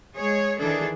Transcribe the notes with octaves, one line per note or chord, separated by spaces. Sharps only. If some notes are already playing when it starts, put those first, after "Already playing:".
G#3 G#4 C#5
D#3 E3 D4 G#4 A4